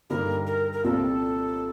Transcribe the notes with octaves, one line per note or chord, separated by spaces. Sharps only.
G2 D3 G3 A#3 D#4 A#4
A#4
A#4
C2 A#2 G3 C4 F4 A4